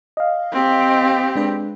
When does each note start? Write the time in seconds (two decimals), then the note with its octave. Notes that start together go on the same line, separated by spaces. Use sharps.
0.17 D#5 F5
0.53 C4 G4
1.36 G#3 D4 B4